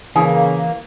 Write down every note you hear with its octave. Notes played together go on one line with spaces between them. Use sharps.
C#3 E3 A#3 G#5 D#6